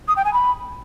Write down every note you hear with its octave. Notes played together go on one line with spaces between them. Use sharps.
D#6
G5
G#5
B5